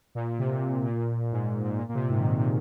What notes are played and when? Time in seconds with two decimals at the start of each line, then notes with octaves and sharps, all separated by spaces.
0.15 A#2
0.39 C3
0.84 A#2
1.32 G#2
1.63 G#2
1.78 A#2
1.89 A#2
1.94 C3
2.10 G#2
2.19 D#3
2.26 C3